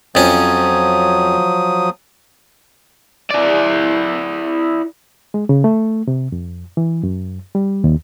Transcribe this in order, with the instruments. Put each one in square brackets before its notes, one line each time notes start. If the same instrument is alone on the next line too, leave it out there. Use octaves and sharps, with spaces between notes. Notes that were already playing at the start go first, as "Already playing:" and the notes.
[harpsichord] F2 C#4 [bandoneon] F3 F#3 D#6
[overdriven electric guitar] E4 D5
[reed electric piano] G#3
C#3
A3
C3
F2
E3
F#2
G3
D#2